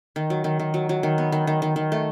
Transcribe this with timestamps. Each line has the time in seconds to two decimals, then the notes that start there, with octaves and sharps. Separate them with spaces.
0.16 D#3
0.30 F#3
0.44 D#3
0.59 D#3
0.74 F#3
0.89 F#3
1.03 D#3
1.18 B3
1.32 D#3
1.47 D#3
1.62 D#3
1.76 D#3
1.92 A3